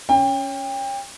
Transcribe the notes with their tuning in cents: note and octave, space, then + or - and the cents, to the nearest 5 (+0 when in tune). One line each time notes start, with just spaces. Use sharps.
C#4 +0 G5 +30